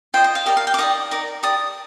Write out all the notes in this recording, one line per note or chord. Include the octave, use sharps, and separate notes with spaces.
F4 C5 D#5 G5
D#5
F5
G4 A#4 D5 D#5
F5
G5
D6
D#4 G4 D5 D#6
D#4 A#4 D5
G4 D5 D#6